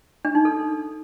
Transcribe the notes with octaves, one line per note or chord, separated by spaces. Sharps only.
D4
D#4
A4